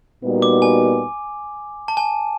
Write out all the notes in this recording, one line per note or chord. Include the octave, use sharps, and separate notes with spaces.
A#2 G3 B3 D#4 F#4
D6
G#5
A5
G#5